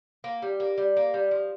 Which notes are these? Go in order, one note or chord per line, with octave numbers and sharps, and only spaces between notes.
A#3
G3
A#3
G3
A#3
G3
F3